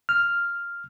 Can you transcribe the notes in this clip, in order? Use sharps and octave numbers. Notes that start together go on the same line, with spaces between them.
F6